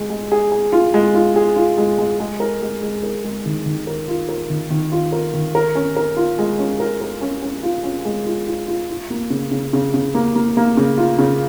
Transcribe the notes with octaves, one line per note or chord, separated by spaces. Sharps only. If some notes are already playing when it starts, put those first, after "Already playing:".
Already playing: G#3
G#3
G#4
G#4
F4
G#3
F4
G#4
F4
G#3
G#3
G#3
A#4
G#3
G#3
A#4
G#3
D#3
D#3
A#4
F4
A#4
D#3
D#3
F4
A#4
D#3
A#4
C#4
A#4
F4
G#3
C#4
A#4
A#4
C#4
C#4
F4
C#4
G#3
F4
F4
F4
F4
A#3
C#3
C#3
C#3
C#3
A#3
A#3
A#3
C#3
F4
C#3